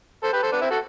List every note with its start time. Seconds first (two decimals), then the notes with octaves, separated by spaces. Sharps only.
0.24 A4 C5
0.33 G4 B4
0.43 A4 C5
0.52 B3 D4
0.61 C4 E4
0.71 F#4 A4